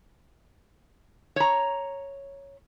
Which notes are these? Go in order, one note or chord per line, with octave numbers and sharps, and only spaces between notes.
C#5 A#5